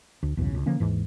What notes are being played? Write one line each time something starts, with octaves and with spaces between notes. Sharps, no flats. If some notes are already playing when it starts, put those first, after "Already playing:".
D2
B1 E2 G2 C#3
C#2
D3 F3 A#3 C#4
D#2 G#2 E3